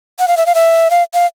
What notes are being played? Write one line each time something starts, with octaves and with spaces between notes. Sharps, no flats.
F#5
F5
E5
F5
E5
F5
F5